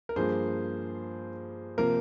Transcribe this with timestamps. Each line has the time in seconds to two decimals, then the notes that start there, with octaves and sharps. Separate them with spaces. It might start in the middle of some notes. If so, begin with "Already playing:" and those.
0.09 A#4
0.16 G2 F3 A#3 G#4 C5
1.78 C3 F3 A#3 A#4